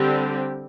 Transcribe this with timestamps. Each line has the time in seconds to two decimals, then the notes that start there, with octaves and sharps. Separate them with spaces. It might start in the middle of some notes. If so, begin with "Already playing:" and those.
Already playing: D3 G3 C4 G4